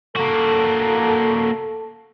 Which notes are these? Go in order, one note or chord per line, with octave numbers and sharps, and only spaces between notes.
A#3 F#4 A4